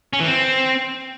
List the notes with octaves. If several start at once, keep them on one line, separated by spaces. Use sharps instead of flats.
C#4
E3
C4